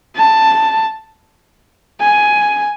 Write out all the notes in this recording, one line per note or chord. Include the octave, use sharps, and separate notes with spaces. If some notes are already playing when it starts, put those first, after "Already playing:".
A5
G#5